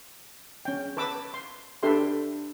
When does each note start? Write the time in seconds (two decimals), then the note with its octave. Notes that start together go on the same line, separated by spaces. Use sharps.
0.65 C#4 G5
0.97 B4 A5 D6 E6
1.34 C6
1.83 D4 G4 A4 B4 E5 C6